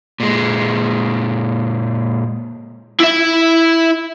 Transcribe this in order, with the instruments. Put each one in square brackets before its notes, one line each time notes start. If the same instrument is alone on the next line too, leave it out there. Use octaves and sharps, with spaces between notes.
[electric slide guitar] A#2 G#3
[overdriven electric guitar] E4 E5